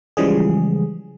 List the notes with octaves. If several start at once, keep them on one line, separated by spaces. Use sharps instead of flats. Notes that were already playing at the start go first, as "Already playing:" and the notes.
C#3 E3 F3 G3 G#3 G#4